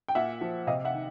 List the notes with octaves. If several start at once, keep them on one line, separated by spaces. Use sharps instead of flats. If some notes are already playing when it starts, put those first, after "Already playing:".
G5
A#2 E5 F#5
F3
C3 D#5 F5
E5 F#5
D#3